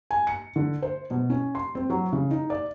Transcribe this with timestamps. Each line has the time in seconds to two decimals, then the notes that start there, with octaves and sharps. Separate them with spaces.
0.11 G#5
0.27 C#7
0.56 D3
0.82 C5
1.11 B2
1.30 C#4
1.55 C6
1.75 C4
1.90 F#3
2.13 C#3
2.31 D#4
2.50 D5